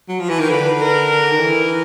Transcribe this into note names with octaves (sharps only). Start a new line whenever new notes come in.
F#3
F3
E3
D#3
D3 B4
A#4
D#3
E3